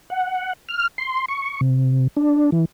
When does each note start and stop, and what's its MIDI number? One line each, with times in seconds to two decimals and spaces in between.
0.10 0.53 78
0.69 0.87 89
0.98 1.25 84
1.28 1.61 85
1.61 2.07 48
2.16 2.50 62
2.52 2.65 52